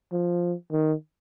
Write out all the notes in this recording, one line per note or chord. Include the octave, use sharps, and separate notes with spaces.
F3
D#3